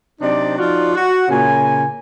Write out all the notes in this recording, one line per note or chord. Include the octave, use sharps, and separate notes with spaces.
C3 F#3 D4 D#4 C5 D5
F3 D#4 F4 F#4 D5
F#4
A#2 C#3 G#5